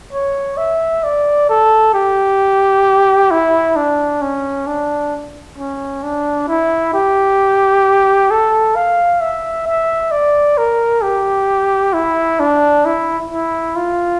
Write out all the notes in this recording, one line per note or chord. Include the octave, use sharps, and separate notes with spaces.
C#5
E5
D5
A4
G4
E4
D4
C#4
D4
C#4
D4
E4
G4
A4
F5
E5
E5
D5
A#4
G4
E4
D4
E4
E4
F4